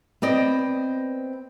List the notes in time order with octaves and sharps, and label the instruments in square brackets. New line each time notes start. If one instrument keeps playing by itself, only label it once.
[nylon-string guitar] B3 C4 D5 D#5